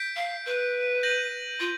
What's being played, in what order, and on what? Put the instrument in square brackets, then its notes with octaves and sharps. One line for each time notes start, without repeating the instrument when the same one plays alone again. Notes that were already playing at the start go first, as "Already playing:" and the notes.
Already playing: [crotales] G6 B6 D7
[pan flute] F5
B4
[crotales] G6 A#6 D#7 F#7
[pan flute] F4